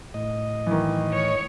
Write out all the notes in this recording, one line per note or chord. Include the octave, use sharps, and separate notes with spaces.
A2 D#5
D#3 E3
C#5